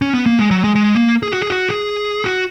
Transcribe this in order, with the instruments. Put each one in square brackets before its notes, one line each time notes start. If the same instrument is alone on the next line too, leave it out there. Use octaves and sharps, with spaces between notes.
[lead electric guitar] C#4
B3
A#3
G#3
F#3
G#3
G#3
A#3
G#4
F#4
G#4
F#4
G#4
F#4